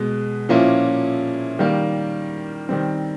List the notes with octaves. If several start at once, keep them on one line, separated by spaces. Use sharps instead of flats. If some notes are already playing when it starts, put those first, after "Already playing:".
Already playing: B2 G#3 B3
A#2 F3 A#3 C#4 E4
D#3 G3 A#3
D#3 G3 C4